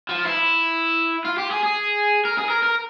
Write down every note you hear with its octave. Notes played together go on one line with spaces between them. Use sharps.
F3
E4
F4
G4
G#4
G#4
A#4
G#4
A#4
A#4